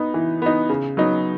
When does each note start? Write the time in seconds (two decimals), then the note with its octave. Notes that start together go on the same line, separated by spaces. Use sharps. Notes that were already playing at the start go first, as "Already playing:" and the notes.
Already playing: B3 D#4
0.14 E3
0.42 B3 D#4
0.69 C#3
0.97 F#3 B3 D#4